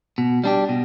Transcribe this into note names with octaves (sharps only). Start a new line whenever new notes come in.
B2
G3 D4 G4
B2